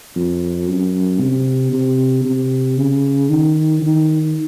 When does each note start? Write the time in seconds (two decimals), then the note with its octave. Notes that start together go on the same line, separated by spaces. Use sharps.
0.16 F2
0.67 F#2
1.20 C3
1.73 C3
2.25 C3
2.78 C#3
3.30 D#3
3.82 D#3